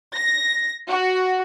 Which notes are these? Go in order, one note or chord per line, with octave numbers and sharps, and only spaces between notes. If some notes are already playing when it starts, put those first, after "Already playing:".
A#6
F#4